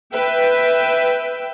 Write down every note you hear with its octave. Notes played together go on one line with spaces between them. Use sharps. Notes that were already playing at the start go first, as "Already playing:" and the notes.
B4 E5 G5